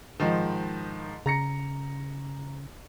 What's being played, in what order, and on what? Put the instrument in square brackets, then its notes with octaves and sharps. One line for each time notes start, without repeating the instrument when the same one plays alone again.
[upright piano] G#2 D#3 F3
[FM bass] C#3 [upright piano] A#5 A#6 C#7